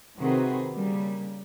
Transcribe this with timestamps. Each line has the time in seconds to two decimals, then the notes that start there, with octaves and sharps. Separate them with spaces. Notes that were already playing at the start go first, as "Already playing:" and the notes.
0.18 C3 D#3 C4 F#4 G#4 B4
0.74 C#3 G3 A#3